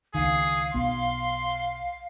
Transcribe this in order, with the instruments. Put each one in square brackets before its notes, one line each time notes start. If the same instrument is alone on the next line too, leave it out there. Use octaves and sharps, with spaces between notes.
[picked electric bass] C#2 D#3 [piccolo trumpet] G#4 [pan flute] F5
[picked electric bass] B1 B3 [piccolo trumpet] C6